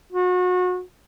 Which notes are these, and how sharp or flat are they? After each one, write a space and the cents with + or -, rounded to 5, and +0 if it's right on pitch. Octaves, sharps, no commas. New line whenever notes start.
F#4 -30